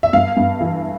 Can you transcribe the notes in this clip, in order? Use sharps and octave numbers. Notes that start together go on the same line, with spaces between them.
E5
G2 F5
G2
E3